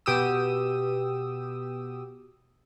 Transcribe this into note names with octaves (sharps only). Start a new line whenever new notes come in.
B2 G4 D#6 E6